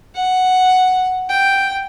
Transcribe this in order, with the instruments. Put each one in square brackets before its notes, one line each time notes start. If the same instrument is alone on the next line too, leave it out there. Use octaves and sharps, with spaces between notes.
[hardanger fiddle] F#5
G5